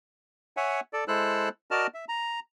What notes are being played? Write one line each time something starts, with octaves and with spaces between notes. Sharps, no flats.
C#5 E5 F#5 G#5
A4 D5
G#3 E4 A4 C5 E6 F#6
F#4 A#4 D5 D#5 A5 F6
E5
A#5